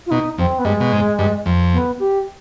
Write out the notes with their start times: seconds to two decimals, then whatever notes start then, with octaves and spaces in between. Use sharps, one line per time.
0.06 F4
0.11 B2 D#4
0.38 F2 C4
0.59 B3
0.65 G2 G#3
0.81 B2
0.93 G#2
1.19 G2
1.46 F2
1.73 B3
1.99 G4